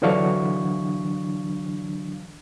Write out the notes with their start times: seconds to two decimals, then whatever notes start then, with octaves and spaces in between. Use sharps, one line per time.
0.02 D3 E3 F#3 D4 F5 C#6